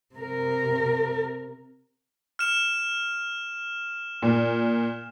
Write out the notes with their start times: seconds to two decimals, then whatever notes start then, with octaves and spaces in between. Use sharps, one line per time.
0.15 C3 A#4
2.39 F6 E7
4.22 A#2